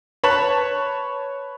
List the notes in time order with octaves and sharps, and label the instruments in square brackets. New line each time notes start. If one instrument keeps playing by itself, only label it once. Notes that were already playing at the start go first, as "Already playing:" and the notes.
[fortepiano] B4 C#5 A5 B5